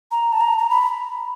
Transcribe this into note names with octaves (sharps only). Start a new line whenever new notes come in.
A#5
A5
A#5
A#5
B5